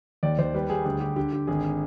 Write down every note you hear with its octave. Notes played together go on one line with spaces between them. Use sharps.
D#2 D5
D#2 C5
G3 B4
G3 G#4
D2 G#4
D3 G4
D3 G4
D3 G4
G#1 G#4